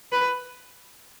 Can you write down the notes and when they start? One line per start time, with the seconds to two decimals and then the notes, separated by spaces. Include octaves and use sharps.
0.12 B4